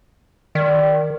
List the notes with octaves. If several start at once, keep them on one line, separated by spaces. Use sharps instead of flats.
D#3 D5